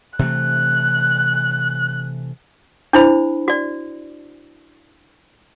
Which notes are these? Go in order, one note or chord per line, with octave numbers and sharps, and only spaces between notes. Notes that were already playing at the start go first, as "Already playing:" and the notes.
C3 E3 A3 F#6
D4 E4 C5 B5
F#4 D5